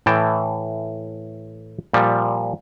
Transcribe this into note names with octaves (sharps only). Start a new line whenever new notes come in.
A2 E3 G5 A5
A#2 F3 G3